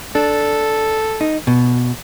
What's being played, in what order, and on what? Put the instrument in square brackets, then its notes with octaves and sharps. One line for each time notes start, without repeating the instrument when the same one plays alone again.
[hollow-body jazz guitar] D4 [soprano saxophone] A4
[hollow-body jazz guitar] D#4
B2